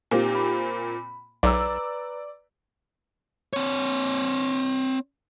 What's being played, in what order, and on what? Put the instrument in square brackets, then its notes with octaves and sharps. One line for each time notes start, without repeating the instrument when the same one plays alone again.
[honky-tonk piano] A#2 A#3 C4 [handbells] D#4 G4
[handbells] B5
[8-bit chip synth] B1 [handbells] B4 A#5 [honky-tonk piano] D5 E6
[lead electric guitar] C4 C#5